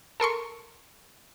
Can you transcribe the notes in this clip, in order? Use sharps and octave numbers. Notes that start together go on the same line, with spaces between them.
A4 A#4 C6 C#6